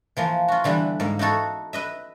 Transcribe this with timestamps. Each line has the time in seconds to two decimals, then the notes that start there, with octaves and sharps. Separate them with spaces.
0.17 E3 F3 A#3
0.48 F4 F#4
0.64 D3 E3 G3 B3
1.00 G#2 A#3
1.19 D#4 E4 F#4 A4
1.73 B4 D#5 E5